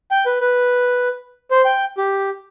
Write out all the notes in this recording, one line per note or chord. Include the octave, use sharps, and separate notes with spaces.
G5
B4
B4
C5
G5
G4